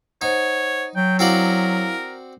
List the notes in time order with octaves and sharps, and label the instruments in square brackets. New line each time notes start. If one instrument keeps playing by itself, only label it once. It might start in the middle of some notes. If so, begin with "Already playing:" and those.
[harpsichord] D#4 [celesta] C5 F#5 [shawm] C#5
[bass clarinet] F#3 [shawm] G5
[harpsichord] C4 F#4 D5 [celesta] E4 F5 F#7 [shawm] A#4